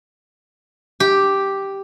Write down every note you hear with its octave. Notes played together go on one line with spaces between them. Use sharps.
G4